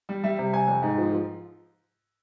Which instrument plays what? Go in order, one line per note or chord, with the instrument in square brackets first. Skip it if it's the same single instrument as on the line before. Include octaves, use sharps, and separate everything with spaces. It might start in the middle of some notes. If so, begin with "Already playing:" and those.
[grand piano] G3
G3 E5
C3
C3 G#5
F2
G#2
F3
F3